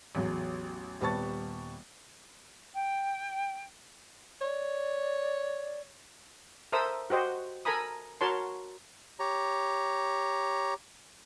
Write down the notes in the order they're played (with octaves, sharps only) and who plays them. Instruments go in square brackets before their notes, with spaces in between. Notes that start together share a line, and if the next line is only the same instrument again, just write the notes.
[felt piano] A1 E2 F#3
D#1 G3 B3 A5 C#6 A6
[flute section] G5
[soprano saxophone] C#5 [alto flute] D5
[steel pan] A4 A#4 C5 E5 D#6 E6
F#4 G4 C5 D#5 F#5
A4 A#4 G#5 A#5 B5 D#6
F#4 A#4 C#5 A5 C6
[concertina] G4 C#5 A#5